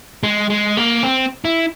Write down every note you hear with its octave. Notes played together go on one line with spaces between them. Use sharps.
G#3
G#3
A#3
C4
E4